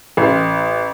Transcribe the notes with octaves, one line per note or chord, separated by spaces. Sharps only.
A1